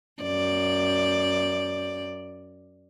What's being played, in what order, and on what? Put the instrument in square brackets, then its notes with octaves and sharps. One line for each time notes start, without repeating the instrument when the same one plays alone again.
[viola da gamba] F#2 D5